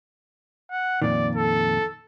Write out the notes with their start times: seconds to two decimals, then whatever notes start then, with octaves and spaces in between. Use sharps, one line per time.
0.71 F#5
1.02 F2 A#2 D#3 D5
1.35 A4